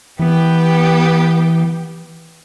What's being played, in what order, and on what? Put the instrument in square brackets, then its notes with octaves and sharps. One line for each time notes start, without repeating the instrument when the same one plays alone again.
[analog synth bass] E3 [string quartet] B3 G4 G5